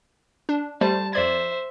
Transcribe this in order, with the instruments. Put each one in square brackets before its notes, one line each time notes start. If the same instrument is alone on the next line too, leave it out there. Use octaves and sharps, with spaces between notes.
[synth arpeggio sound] D4
[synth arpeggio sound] G3 A3 C5 [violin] A5
[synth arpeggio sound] F2 D5 G#6 [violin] C5 E5